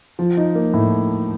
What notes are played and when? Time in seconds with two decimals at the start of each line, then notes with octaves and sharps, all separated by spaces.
0.19 F3
0.37 D#4
0.55 A#3
0.74 A2